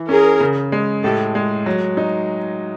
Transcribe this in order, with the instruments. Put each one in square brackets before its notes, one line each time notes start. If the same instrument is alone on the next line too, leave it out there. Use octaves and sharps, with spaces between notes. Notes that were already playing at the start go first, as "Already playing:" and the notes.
Already playing: [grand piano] E3
[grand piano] C#4 [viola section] G#4 A#4
[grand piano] C#3
G#3
[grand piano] A2 [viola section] G4 A4
[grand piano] G#3
F#3
D#4